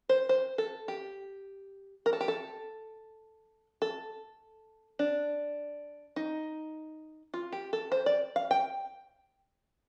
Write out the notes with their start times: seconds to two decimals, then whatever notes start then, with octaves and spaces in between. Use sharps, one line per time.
0.09 C5
0.29 C5
0.58 A4
0.88 G4
2.06 A#4
2.13 A4
2.21 G4
2.28 A4
3.82 A4
4.99 D4
6.16 D#4
7.34 F4
7.52 G4
7.73 A4
7.92 C5
8.06 D5
8.36 F5
8.51 G5